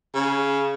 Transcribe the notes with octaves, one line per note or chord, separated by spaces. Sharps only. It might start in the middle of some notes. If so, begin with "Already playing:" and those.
C#3